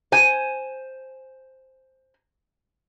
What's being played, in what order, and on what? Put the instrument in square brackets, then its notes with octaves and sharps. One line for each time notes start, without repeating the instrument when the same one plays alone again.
[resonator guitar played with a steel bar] C5 G#5